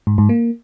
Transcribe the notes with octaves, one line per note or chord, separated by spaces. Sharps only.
G#2
G#2
A#3